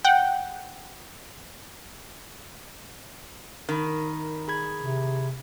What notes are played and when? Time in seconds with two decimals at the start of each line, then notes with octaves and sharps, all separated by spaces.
0.05 F#5 G5
3.69 D#3 A#4 B5
4.48 G#4 B5 G#6
4.79 C3